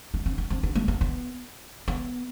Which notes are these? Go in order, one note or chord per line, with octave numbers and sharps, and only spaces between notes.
B3
C4
B3
C4
B3
A#3
B3
B3
B3